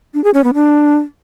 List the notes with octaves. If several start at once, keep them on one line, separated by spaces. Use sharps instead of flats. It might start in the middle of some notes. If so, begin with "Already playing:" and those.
D4
G#4
C#4
B3
D4